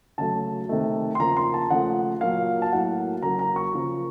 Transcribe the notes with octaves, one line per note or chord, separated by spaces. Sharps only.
C#3 F#3 A3 A5
C3 D#3 A3
C6
C#3 F3 A#3 A#5
C6
A5
C#3 F3 A3 F#5
A#2 F#3 A#3 F5
A5
A2 F#3 A#3 F#5
C#3 F#3 A#3 A#5
A#5
C#6
C#3 F3 A#3